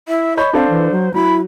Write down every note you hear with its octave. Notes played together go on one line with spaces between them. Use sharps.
E4 E5
C#5 D#5 B5 G6
C4 D4 A4 C5 F5
E3
F#3
F#3 E4 B5